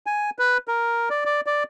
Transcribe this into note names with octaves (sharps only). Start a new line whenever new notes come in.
G#5
B4
A#4
D5
D5
D5